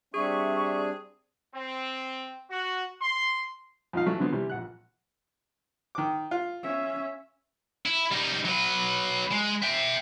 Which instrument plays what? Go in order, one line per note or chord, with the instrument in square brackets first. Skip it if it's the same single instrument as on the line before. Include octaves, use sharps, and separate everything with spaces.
[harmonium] G3 C4 D4 [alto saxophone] G#4 [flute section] E5 C#6
[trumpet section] C4
F#4
C6
[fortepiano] F2 A#2 D#4 F5
E3 F#3 A3
D3 F#3 B3 C4
C3 E3 G3
A#1 F#5 F#6
D#3 D6
F4
[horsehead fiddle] C#4 E5
[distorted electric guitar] E4
G3 D#4
F#3 B4
G#3
E5 G5